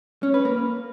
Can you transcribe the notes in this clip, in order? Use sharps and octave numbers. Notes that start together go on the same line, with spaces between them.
C#4
B4
A#3